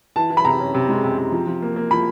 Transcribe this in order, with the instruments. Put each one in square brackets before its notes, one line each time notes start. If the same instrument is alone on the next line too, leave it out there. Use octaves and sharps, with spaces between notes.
[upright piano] E3 A5
E3
B5
C3 A#5
C#4
C3
G#3
C3
C3
F3
F3
A#3
A#3
F3 B5